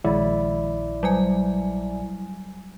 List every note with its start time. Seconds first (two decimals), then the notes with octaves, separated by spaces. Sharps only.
0.04 A#1 D#3 G#3 E4 D5
1.03 F#3 G3 G#5